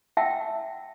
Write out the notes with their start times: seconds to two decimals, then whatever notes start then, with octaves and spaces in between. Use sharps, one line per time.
0.17 E4 E5 F#5 G5 A5 E6